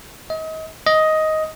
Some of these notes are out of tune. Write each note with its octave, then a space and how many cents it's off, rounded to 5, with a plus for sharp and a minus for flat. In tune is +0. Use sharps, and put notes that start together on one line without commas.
D#5 +35
D#5 +10